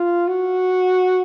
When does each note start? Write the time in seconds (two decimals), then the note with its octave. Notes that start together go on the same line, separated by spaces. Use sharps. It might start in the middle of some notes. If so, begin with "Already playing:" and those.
Already playing: F4
0.28 F#4